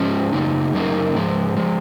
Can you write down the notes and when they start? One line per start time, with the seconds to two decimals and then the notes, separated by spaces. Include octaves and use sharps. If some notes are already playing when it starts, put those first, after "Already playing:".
Already playing: G#2 F3 G#3 C#4
0.32 F#2 C#3 F#3 A#3 D#4
0.73 F#2 C#3 F#3 A#3 D#4
1.15 G#2 F3 G#3
1.57 F3 G#3